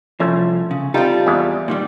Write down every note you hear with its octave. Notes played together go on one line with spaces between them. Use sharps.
C2 F3 A3 C#4
C#3
G3 C4 D#4 F4 A4
E2 G#3 E4
A#2 D#3 G3